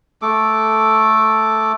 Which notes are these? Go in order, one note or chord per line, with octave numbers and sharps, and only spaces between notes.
A3 A4 D6